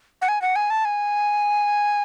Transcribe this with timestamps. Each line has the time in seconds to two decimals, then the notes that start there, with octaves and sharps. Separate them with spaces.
0.22 F#5
0.28 G#5
0.42 F#5
0.56 G#5
0.70 A5
0.85 G#5